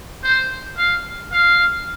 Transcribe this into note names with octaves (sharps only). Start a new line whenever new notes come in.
C5
F5
F5